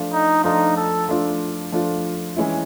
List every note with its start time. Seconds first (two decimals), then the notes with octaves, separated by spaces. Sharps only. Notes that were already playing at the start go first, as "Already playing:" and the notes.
Already playing: F3 A3 D4 F4
0.12 D#4
0.44 F3 A3 D4 D#4 F4
0.77 A4
1.09 F3 A3 D4 F4
1.72 F3 A3 D4 F4
2.37 E3 G#3 C#4 E4